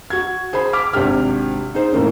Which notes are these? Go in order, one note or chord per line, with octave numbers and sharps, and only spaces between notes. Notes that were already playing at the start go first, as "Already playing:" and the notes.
F#4 G#6
G#4 C5 G#5 B5
D6 F6 B6
G#1 C3 D4 G4 F6
D#4 G#4 C5
A2 E3 A#3 C#4